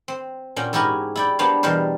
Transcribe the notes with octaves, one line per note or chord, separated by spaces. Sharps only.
C4
A#2 C#4 F#4 G5
G#2 E4 F#4 G4 A#4 G#5
E4 D5 G5
G3 A#3 B3 D4 C5 C#5
E2 B2 G3 A#4 C5